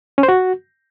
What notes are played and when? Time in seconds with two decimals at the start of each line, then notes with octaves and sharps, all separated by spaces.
0.18 C#4
0.23 C5
0.28 F#4